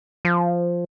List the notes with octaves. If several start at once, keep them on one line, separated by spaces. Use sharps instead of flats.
F3